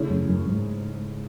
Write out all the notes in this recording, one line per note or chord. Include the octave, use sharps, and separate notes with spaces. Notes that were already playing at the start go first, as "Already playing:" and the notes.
Already playing: C#3 E3 A3 C#4 G#4
F#2
F#2
G#2